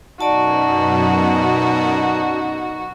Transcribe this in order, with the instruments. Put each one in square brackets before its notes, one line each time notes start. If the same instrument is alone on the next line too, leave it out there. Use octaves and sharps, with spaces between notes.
[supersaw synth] F#2 B2 [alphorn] D#4 [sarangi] F#4 [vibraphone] D5 A5